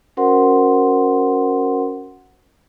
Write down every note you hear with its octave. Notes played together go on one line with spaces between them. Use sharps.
C#4 F#4 A#4 C5 F#5 C6